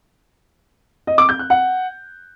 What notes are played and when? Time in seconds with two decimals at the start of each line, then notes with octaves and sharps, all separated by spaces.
1.07 D#5
1.18 D6
1.29 G6
1.39 F#6
1.50 F#5